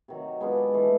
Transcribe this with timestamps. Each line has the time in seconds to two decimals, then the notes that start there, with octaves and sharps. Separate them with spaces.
0.08 C3 D#3 F#3
0.40 G#3 B3 D4 F4
0.74 E3 A3